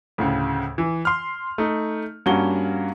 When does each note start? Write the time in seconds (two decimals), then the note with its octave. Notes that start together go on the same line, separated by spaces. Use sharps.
0.18 D2 A2 C#3
0.78 E3
1.05 C6 F6
1.58 A3 D#4
2.26 G2 A#3 C#4 F#4 G7